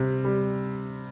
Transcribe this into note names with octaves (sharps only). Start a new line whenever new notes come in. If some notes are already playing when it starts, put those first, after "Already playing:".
Already playing: C3 G3
G3